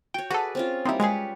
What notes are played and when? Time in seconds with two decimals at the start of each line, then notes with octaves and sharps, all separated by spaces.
0.14 F#4 C#5 G5
0.30 F#4 G#4 A4 B4 D5
0.55 C4 C#4 F4
0.85 G3 A#3 C4 D#4 E4
1.00 G#3 G4 G#4 B4 C#5